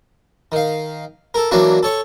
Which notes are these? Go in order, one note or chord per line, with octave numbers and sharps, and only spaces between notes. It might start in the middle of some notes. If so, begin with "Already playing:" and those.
D#3 F5
A4 A#4
E3 F#3 A#3 D4 F#4
A4 C#5 C#6